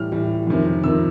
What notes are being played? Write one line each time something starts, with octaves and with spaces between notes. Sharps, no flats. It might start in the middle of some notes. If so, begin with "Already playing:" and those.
Already playing: A2 E3 G3 F6
A2 E3 G3
F2 C3 D#3
F2 C3 D#3 E6